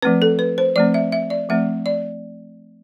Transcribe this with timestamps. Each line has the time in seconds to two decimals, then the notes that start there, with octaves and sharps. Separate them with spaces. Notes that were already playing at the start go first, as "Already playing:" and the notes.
0.02 F3 A3 C4 B4
0.22 A4
0.39 B4
0.58 C5
0.76 F3 A3 C4 D5
0.94 E5
1.12 E5
1.30 D5
1.49 F3 A3 C4 E5
1.86 D5